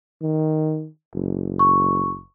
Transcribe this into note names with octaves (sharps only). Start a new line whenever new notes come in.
D#3
F#1
C#6